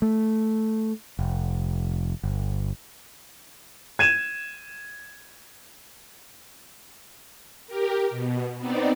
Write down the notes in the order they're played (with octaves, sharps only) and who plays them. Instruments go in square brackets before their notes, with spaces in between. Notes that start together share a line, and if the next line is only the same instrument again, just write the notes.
[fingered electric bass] A3
F1
G1
[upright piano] G#6 D#7 E7
[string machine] G4 A#4
B2
B3 C4 D#4 D5